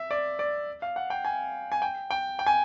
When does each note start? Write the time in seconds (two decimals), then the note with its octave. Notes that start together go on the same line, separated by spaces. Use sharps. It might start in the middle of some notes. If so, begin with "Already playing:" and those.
Already playing: E5
0.11 D5
0.39 D5
0.82 F5
0.96 F#5
1.10 G5
1.25 G#5
1.72 G#5
1.82 G5
2.11 G5
2.39 G5
2.46 G#5